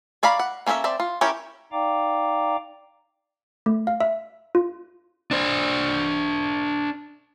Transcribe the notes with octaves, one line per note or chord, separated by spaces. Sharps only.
C#5 D5 F5 A#5 B5
F#5
A#3 C#4 A4 C5 E5
C4 D5 E5 A5
F4
C#4 E4 G4 A#4 C#5
D#4 D5 F5 G5 A#5 D6
A3
F5
E5
F4
D4 C5